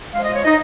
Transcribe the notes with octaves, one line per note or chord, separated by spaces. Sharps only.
F3 G#3 F5
D#5
C#5
D#4 D#5